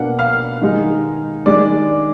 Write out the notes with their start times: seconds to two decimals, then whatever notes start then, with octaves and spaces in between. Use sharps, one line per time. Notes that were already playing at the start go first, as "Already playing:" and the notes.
Already playing: B2 A#3 D4 F#5
0.19 F5 F6
0.62 D#3 G#3 D#4
1.46 D#3 G#3 D4 D5 D6